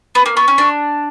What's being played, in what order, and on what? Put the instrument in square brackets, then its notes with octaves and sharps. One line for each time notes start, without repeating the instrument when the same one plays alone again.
[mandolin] B3 [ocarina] B5
[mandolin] A#3
[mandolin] B3 [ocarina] C#6
[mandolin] C#4
D4